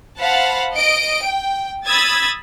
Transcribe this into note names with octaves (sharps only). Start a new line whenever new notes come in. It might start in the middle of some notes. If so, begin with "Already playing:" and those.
C5 F5 F#5 A5 B5
D#5 D7
G5
B5 D#6 E6 G#6 A6